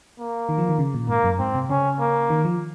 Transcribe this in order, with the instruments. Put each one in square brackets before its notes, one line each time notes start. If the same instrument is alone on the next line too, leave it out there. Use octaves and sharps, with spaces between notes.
[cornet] A#3
[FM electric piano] D#3
F3
D#3
C#3
A#2
[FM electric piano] G#2 [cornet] A#3
[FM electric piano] F#2
[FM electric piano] G#2 [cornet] C4
[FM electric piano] C3
[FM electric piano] C#3 [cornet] C#4
[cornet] A#3
[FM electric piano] D#3
F3